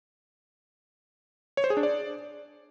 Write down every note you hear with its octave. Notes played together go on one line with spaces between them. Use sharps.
C#5
C5
G#4
D4
D5